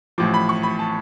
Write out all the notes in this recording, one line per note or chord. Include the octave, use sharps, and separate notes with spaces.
A1 A2 F3 D6
B5
C#6
B5
A5